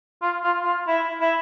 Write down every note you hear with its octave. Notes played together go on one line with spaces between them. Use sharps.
F4
F4
F4
E4
E4